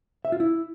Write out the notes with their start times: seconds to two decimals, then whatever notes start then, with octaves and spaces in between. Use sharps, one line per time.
0.25 E5
0.32 F4
0.40 E4